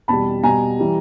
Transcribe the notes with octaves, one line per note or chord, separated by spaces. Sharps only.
E2 B2 G3 A5 B5
B2 G3 G#5 A#5
E3 G3